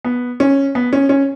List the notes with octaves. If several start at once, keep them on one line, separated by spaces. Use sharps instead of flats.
B3
C#4
B3
C#4
C#4